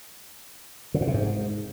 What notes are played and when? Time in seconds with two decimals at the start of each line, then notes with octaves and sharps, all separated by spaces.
0.94 C#3
1.01 A#2
1.07 C3
1.14 G#2